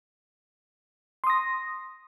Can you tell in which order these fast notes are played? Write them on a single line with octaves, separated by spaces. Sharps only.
C6 D#6 A#6